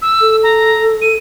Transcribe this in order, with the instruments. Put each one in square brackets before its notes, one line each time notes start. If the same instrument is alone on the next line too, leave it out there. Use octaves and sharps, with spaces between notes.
[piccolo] E6
[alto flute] A4
[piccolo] A#5
D#7